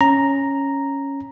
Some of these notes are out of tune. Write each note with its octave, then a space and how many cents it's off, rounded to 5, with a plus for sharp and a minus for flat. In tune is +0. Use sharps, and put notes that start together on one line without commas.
C#4 -5 A#5 +0